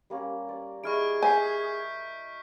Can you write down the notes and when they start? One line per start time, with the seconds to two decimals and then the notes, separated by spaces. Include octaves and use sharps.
0.10 G3 A#3 C#4
0.49 D5
0.84 E4 G#4 D#5 C#6 F6 D7
1.23 G#5 G6 B6 C7